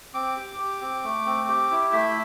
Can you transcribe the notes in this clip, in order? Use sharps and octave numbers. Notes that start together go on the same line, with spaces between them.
C4 D6
G4
G4
C4
A3
C4
G4
E4
A3 E5